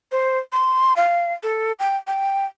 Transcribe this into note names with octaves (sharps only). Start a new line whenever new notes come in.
C5
C6
F5
A4
G5
G5